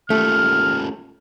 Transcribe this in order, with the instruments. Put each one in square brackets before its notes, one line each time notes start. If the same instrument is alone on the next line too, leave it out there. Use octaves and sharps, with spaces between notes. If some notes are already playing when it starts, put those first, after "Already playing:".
[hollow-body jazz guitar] A3 [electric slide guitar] C#4 F4 G4 [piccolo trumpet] F6